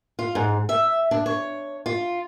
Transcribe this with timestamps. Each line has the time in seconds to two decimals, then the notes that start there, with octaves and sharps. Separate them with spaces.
0.19 F4
0.35 G#2
0.69 E5
1.11 D4
1.26 C#5
1.86 F4